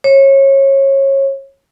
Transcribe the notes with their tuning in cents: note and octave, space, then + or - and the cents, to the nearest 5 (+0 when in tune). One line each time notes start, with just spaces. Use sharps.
C#5 -25